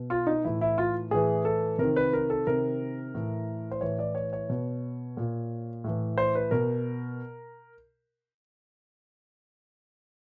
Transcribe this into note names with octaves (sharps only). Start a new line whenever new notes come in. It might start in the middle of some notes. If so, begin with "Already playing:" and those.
Already playing: B2
F4
D#4
A2 E3 E4
E4
F4
A2 E3 G#4
A4
C3 D#3 A#4
B4
A#4
A4
C3 D#3 A#4
A2 E3
C5
A2 E3 C#5
D5
C#5
C#5
B2
A#2
A2 E3
C5
B4
B2 A#4